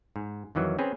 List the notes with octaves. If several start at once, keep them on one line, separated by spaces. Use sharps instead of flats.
G#2
F2 D#3 E3 F#3
C4 C#4 G#4 B4